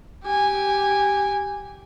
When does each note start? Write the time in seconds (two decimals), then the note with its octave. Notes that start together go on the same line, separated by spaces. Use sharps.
0.25 G4 G#5